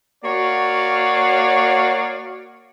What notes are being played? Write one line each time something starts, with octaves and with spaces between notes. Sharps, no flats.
A#3 F#4 C#5 D5 F5